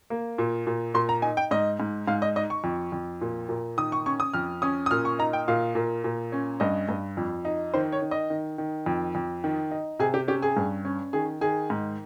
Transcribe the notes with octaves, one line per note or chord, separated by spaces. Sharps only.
A#3
A#2
A#2
A#2 C6
A#5
D#4 G#5
G5
G#2 D#5
G#2
G#2 F5
D#5
D#4 D#5
C#6
F2
F2
A#2
A#2
D#3 D#6
C#6
C#4 C#6
D#6
F2 F6
C#4 D#6
D#6
A#2 F6
C#6
D#4 A#5
G5
A#2 F5
A#2
A#2
C#4
G2 D#5
G2
F2
D#4
D#3 C5
C#5
D#3
D#5
D#3
D#3
F2
F2
D#3
D#4
C3 G#4
G4
C#4 G4
G#4
G2
C#4
D#3 G#4
D#3 G#4
G#2